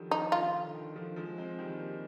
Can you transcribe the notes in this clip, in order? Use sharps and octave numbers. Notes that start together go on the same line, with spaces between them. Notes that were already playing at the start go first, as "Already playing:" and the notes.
Already playing: D3 D#3 F3 G3
D#4
D#3 F4
D#3
D3
D#3
D3 F3
F3 G#3
G#3 C4
D#3 G3
G3 A#3